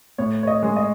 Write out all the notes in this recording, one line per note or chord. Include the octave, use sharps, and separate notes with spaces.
A2 C#5
C#5
D#5
G#3
D#5